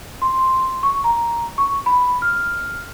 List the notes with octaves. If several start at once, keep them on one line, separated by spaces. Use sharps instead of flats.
C6
C#6
A#5
C#6
B5
F6